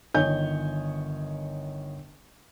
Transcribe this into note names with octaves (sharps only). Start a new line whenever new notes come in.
G1 D#3 C#5 D#5 G#5 G6